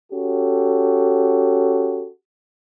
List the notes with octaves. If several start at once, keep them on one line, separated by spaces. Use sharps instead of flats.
C#4 F#4 G4 A4